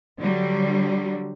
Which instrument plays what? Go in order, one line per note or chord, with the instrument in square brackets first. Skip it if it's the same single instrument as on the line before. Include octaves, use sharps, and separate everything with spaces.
[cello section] D3 F#3 G3